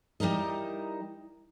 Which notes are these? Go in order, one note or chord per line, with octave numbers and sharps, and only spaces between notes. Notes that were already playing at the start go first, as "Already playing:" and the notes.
G3 D#4 E4 A#4 D#5